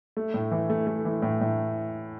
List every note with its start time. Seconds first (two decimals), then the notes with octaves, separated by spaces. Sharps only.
0.17 A3
0.34 A2
0.51 E3
0.70 A3
0.87 A3
1.05 E3
1.22 A2
1.41 A2